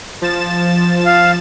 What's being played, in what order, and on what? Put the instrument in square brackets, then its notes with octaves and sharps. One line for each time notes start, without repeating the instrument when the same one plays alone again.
[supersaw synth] F3 A6 E7
[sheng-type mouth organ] F5